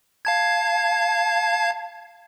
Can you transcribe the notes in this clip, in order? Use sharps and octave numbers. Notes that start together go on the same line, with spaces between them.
F5 A5 G#6